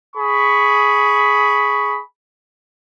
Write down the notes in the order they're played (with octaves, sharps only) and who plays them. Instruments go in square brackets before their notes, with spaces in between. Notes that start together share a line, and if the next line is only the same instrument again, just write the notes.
[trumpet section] G#4 B5 C#6